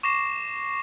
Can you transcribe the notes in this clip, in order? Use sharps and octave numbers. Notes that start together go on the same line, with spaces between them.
C#6 D6 A#6 C7 E7